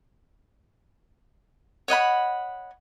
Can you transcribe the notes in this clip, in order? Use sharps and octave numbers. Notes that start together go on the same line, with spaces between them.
C#5 D#5 F#5 B5